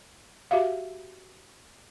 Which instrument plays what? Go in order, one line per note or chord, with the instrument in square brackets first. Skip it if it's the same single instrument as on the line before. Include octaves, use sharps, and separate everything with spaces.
[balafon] F#4 G4 E5 F5